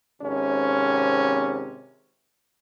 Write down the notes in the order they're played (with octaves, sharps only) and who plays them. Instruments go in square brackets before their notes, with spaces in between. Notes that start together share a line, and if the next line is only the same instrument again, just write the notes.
[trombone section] G#1 C3 C#4